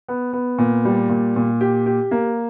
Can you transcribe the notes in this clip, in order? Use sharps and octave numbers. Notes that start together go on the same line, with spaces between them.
B3
B3
A#2
G3
A#2
A#2
G4
G4
A#3